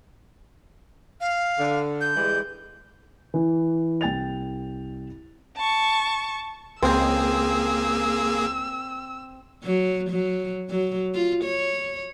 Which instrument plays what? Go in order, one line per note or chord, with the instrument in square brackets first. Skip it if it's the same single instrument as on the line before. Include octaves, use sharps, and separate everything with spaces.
[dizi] F5
[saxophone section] D3
[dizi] G6
[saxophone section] E3 G3 G#3
[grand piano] E3
C2 G5 A6 F7
[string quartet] A5 C#6
[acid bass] C#2 [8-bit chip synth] A#3 G#4 [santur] C4 [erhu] E6
[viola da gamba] F#3
F#3
F#3
F4
C#5